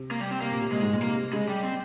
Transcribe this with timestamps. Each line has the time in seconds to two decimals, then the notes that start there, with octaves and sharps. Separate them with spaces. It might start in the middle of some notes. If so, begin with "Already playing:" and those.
Already playing: C3
0.11 A#3
0.21 G3
0.31 C4
0.41 C3 A#3
0.52 A#2
0.61 C3
0.72 A#2 G#3
0.82 G#2
0.93 A#2
1.02 C3 A#3
1.33 C#3 G#3
1.48 G3
1.63 C4